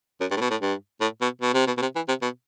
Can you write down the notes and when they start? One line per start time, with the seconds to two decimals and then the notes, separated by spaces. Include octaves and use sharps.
0.20 F#2
0.31 G2
0.37 A2
0.41 B2
0.51 A2
0.61 G2
1.01 A2
1.21 B2
1.42 B2
1.54 C3
1.67 B2
1.77 B2
1.81 C3
1.95 E3
2.08 C3
2.22 B2